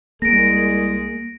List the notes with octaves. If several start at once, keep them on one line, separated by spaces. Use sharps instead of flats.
C2 G#3 A#3 G#4 A#6 D7